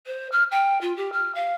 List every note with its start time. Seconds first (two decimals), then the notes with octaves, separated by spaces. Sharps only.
0.07 C5
0.32 F6
0.51 G5
0.81 F4
0.97 G4
1.12 F6
1.35 F5